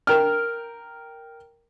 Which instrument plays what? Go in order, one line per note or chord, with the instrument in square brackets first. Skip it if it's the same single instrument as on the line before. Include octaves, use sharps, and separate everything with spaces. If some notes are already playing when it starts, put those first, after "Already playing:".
[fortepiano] A#4 G5 F6